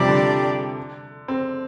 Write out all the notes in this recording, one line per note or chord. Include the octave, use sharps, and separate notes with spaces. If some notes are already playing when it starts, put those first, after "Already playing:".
Already playing: C3 F3 G3 D4 G4 D5
D3
C4